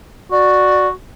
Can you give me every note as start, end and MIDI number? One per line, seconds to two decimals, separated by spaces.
0.31 0.91 66
0.31 0.87 74